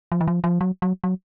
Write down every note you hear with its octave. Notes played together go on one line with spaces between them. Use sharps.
F3
E3
F3
F3
F#3
F#3
F#3